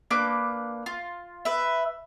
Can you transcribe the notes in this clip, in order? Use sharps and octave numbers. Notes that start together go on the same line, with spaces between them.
A#3 D4 B4 D6
F4
B4 E5